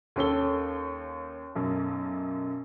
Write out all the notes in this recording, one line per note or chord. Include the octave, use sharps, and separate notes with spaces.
D#2 C#4 A4 G7
B1 F#2